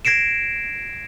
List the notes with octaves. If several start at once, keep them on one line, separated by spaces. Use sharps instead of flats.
G#6 A#6 C7 D7 E7